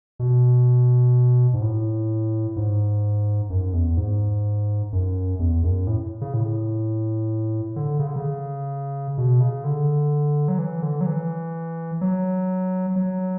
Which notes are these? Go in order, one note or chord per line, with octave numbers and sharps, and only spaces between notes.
B2
G#2
A2
G#2
F#2
E2
G#2
F#2
E2
F#2
A2
C#3
A2
D3
C#3
D3
C#3
B2
C#3
D3
F#3
E3
D3
F#3
E3
F#3
F#3